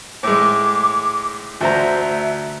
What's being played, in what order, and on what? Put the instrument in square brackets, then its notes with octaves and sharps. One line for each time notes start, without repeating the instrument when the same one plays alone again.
[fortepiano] A2 G#3 [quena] D6
[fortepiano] D2 C5 A#5 [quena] E5